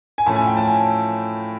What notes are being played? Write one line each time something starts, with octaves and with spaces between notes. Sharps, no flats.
G#5
A2 F3 A3 C#4 A5
G#5
G5
A5
G#5